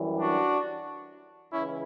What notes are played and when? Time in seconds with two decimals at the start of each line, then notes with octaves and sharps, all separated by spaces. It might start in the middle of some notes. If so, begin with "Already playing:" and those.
Already playing: F#2 E3 G3
0.20 D4 F#4
1.52 C#2 C#3 E3 C#4 E4